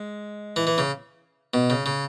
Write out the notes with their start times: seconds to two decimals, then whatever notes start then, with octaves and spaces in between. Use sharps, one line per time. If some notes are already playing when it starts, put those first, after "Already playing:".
Already playing: G#3
0.56 E3
0.67 E3
0.78 C#3
1.54 B2
1.70 C#3
1.86 C#3